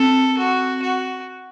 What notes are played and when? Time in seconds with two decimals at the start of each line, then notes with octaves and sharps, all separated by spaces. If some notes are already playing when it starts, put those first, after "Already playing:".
Already playing: C4 A4
0.38 F#4
0.82 F#4